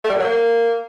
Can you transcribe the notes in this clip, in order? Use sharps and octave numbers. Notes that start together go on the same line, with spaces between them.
A3
G3
A#2
F#3
A#3